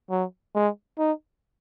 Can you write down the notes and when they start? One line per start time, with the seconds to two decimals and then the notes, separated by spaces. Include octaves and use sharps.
0.10 F#3
0.55 G#3
0.99 D#4